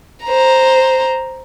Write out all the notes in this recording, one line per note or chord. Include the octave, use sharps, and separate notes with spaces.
C5 A#5